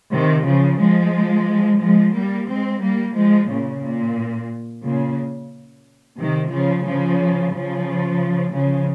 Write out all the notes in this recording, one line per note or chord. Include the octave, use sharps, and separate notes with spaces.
C3 D#3
C#3 F3
F3 G#3
F3 G#3
G3 A#3
G#3 C4
G3 A#3
F3 G#3
A#2 C#3
A#2
A#2 C#3
C3 D#3
C#3 F3
C#3 F3
C#3 F3
C#3 F3